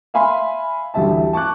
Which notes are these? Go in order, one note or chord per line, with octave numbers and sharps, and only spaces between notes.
E5 F5 G#5 B5 C6
A1 D2 G3 E5 A5
A5 C#6 D6 F#6